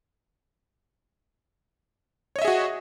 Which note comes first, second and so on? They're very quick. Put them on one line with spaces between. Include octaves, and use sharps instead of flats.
C#5 D#5 E5 G#4 F#4